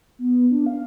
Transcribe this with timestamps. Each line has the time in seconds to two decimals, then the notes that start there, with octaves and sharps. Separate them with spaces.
0.19 B3
0.51 D4
0.66 F5